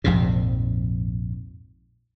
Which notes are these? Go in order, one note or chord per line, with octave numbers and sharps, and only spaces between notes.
A#1 F2 G#2 C3